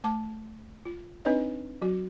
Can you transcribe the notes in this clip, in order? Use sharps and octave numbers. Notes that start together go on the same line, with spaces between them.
A3 A5 D6
F4
C4 D4 D#4 B4 C#5 D#5
F#3 F#4